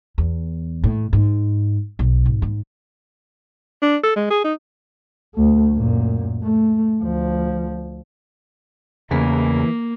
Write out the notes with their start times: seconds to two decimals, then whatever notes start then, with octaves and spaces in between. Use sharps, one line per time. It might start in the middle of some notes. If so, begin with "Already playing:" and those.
0.18 E2
0.84 A2
1.13 G#2
1.99 B1
2.26 G#1
2.42 G#2
3.82 D4
4.03 A4
4.16 G#3
4.30 G#4
4.44 D#4
5.34 D2 A3
5.74 F#2 A#2
6.43 A3
7.03 D2 F3
9.11 E2 C#3 E3 A#3